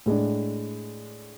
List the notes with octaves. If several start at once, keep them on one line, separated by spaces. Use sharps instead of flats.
A2 G#3 D4